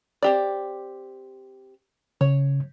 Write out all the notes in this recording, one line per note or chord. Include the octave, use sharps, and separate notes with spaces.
C4 G4 D5
C#3 C#5